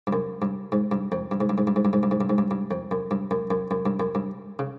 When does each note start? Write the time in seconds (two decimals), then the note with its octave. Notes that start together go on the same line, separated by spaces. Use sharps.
0.07 G2
0.13 F#2
0.42 G2
0.72 G#2
0.91 G2
1.12 F2
1.31 G2
1.40 G#2
1.49 G2
1.58 G#2
1.67 G2
1.76 G#2
1.85 G2
1.93 G#2
2.03 G2
2.11 G#2
2.21 G2
2.30 G#2
2.38 G2
2.51 G2
2.71 F2
2.91 F#2
3.11 G2
3.31 F#2
3.50 F#2
3.71 F#2
3.86 G2
4.00 F#2
4.15 G2
4.59 C#3